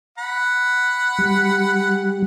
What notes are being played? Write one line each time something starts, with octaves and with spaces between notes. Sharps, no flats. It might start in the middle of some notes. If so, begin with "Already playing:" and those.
F#5 B5
G3